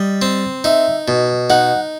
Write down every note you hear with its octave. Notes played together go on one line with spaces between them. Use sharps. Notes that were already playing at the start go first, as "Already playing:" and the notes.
Already playing: G3 D#5
C4
D#4 E5
B2
D#4 F#5